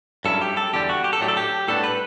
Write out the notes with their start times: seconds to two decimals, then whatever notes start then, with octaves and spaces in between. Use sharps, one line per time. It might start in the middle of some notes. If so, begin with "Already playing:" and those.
0.25 G2 F#3 C#4 E4 A4
0.42 G4
0.57 A4
0.73 E2 D3 G3 G4
0.89 F#4
1.04 G4
1.13 A4
1.21 A2 F#3 A3 D4 G4
1.28 A4
1.37 G4
1.68 A2 G3 B3 D4 A4
1.84 B4